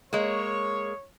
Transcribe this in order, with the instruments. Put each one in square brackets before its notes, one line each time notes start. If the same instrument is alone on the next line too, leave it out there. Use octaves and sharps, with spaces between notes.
[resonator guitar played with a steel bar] G#3 A#3 [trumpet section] C#5